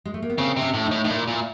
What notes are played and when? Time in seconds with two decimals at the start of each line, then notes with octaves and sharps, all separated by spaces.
0.05 G#3
0.14 A3
0.22 A#3
0.30 B3
0.38 C#3 C4
0.57 C3
0.62 C#4
0.74 A2
0.86 D#4
0.91 A2
1.04 A2 D#4
1.10 A#2 E4
1.28 A#2